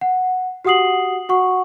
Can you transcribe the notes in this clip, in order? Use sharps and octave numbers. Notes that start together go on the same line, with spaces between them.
F#5
F#4 G4 F#5 D#6 C7 F#7
F#4 F#5 C#6